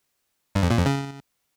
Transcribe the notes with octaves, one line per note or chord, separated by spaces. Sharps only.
G2
F2
A#2
F2
C#3